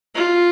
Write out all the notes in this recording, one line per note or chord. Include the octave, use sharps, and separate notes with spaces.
F4